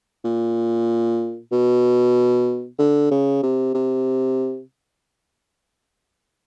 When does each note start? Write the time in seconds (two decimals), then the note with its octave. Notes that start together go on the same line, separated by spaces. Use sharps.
0.25 A#2
1.52 B2
2.79 D3
3.11 C#3
3.43 C3
3.75 C3